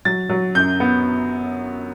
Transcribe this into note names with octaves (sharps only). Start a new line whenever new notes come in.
F#3 A6
F#3
F#2 G6
B3